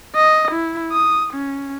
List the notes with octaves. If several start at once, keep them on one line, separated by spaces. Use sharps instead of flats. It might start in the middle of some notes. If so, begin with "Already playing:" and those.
D#5
E4
D#6
C#4